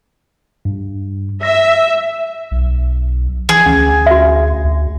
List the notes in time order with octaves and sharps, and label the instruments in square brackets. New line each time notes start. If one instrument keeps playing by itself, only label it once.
[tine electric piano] G2
[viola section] E5 [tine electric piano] A#6
[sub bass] B1
[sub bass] E3 [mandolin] G#4
[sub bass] D2 [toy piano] C#4
[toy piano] F#4 E5
[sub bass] D2